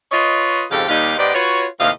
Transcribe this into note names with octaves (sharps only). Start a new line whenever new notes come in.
F4 B4 C#5 D#5
F2 G#2 C#3 G4 A4 F5
D#2 G3 A#3 D#4 G4 F5
G#2 G#3 B3 G4 D5
F4 F#4 B4 C#5
D#2 A2 C3 D#5 F5